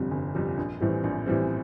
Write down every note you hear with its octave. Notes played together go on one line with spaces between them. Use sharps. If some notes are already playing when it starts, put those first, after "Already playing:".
Already playing: G1 F2 C3 G3
G1
F2 C3 G3
A#1
A2 E3 G3 C4
A#1
A2 E3 G3 C4